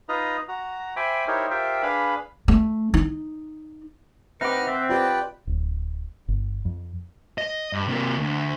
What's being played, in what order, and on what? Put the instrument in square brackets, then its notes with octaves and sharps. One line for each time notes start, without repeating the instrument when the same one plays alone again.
[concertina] D#4 F4 B4 D#5 A#5
F#4 A#5
C5 E5 G5 G#5 B5 D6
D#4 E4 G4 A#4 C5 C#5
F4 G4 A#4 C5 E5 G5
D4 G#4 B4 F5 B5
[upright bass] A3
D#4
[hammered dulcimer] C3 F#5 D6 [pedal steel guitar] D#4 [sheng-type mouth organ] B4 F6
[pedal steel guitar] C4 [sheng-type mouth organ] E5
[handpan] F4 G4 D#5 [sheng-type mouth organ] B4 D5 G5
[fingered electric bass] D1
G1
F2
[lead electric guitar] D#5
G2
C3 A#3
D2